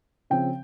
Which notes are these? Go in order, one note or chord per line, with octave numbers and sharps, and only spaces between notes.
C#3 F3 C4 G5